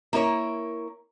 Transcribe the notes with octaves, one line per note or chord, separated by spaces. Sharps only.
A#3 E4 A#4 C#5